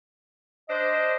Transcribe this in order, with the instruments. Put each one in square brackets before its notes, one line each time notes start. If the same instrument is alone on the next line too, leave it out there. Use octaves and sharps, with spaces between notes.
[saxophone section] D4 C5 [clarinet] D#5